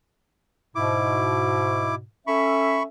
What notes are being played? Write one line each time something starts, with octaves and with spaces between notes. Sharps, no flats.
G#2 B2 E4 D6
C#4 A4 E5 B5 C#6